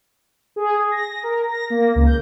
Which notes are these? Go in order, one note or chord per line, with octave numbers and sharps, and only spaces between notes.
G#4
A#6
A#4
A#6
A#3
C#2
G6